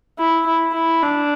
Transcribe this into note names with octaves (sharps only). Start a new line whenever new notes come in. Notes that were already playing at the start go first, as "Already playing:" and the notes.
E4
E4
E4
D4